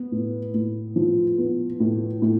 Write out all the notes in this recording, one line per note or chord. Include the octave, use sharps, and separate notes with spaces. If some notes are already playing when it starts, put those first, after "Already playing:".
Already playing: B3
A2
A2
F3
B3
A2
A2